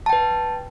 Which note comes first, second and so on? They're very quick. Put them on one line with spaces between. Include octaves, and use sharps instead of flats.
A5 G5 B4